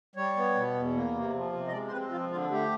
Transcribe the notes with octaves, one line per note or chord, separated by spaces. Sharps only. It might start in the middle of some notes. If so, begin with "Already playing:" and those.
G3 C#5
B3
B2
E2
A#3
C3
F3
C3
D#5
G#3 D5
C5
C4 B4
F3 F4
D3 F4
A3 G4